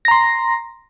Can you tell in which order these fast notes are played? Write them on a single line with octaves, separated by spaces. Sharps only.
A#6 A#5 C6